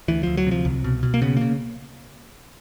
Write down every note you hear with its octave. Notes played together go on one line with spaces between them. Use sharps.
D2 E3
D2 F3
F#3
C3 F3
C2
B2
B2
A#3
C#3 B3
C#3 A#3